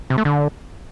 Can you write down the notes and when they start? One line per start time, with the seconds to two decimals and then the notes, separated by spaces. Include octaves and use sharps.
0.10 C3
0.18 A3
0.25 D3